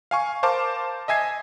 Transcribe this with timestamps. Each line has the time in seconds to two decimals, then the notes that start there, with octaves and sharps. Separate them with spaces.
0.11 F5 G#5 C#6
0.43 A#4 C5 F5 A5 D6
1.08 D#5 E5 G#5 G#6 C7